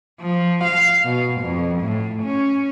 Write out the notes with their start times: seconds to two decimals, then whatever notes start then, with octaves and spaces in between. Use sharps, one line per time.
0.22 F3
0.65 F5
1.05 B2
1.42 F2
1.81 A2
2.24 C#4